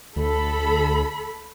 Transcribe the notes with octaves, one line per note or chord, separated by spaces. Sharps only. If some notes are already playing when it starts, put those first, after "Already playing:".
D2 A4 B5